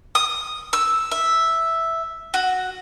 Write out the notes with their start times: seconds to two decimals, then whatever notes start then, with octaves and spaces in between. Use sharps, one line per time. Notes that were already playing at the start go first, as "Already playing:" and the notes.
0.15 D#6
0.73 E6
1.11 E5
2.34 F#4